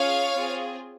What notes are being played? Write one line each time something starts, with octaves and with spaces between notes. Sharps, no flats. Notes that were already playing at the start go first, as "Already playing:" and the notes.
Already playing: C#4 F4 G#4 C#5 F5
C4 F4 G#4